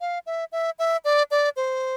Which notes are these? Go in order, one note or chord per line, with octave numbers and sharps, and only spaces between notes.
F5
E5
E5
E5
D5
D5
C5